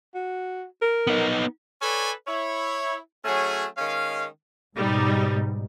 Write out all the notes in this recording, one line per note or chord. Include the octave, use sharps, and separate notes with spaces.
F#4
A#4
B3 D#4
A4 B4 C#5 D5 G#5
E4 C#5
F#3 A3 C#4 G#4
D#3 G#3 C#4 F5
G#2 B2 G3 D#4